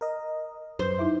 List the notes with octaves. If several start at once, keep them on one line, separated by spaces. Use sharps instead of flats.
A#4 D#5
F#2 B4 C5 C6
D#4 E4 E5